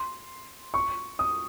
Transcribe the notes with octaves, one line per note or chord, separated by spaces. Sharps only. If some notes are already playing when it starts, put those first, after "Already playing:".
Already playing: C6
C#6
D#6